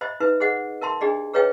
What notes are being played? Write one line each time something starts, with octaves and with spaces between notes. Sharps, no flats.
C5 D#5 E5 B5
D#4 B4 E5
G#4 C5 D#5 F#5
A#4 E5 A5 C6
D4 G4 G#4 D5 D#5
G#4 B4 C#5 D#5 F5 G5